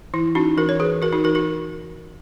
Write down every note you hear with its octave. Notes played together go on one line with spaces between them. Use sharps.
E3 E4
C#4 D#4 F#4
E3 F#4 A#4
C#5
E3 G#4 B4
E3 F#4 A#4
D#4 F#4
E3 F#4 A#4
F#4 A#4